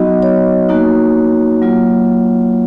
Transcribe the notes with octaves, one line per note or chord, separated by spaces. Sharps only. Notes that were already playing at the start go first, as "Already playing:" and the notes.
Already playing: F#3 B3 D#4 F#4 D#5
C#5
A#3 D#4 F#4
F#3 A#3 F4